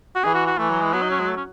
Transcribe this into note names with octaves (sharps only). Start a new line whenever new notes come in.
F#4
E3 G#4
F#4
F#4
E3 A3
F#3
G#3
F#3 B3
D#4
C#4
G#3
A3
C#4